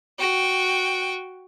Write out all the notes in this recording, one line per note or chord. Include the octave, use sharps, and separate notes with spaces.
F#4 G5